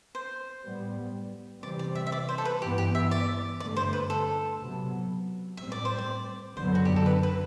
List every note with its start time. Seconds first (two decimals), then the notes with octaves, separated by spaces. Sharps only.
0.15 C5
0.65 A2 G3 B3
1.63 C3 E3 G3 C4 D5
1.79 D5
1.95 E5
2.07 E5
2.12 D5
2.29 C5
2.38 A4
2.45 B4
2.62 G2 E3 B3 G4
2.78 G4
2.95 E5
3.11 D5
3.60 G2 D3 A3 D5
3.76 C5
3.93 B4
4.10 A4
4.59 C3 F#3 B3
5.57 A2 G3 C4 E5
5.72 D5
5.85 C5
5.99 D5
6.57 F#2 D3 F#3 B3 C5
6.75 F#4
6.85 G4
6.96 A4
7.06 B4
7.23 B4